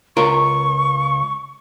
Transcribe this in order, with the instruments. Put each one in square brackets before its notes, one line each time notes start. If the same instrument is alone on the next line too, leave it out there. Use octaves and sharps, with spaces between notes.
[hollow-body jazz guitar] C#2 F4 A#4 [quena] C#6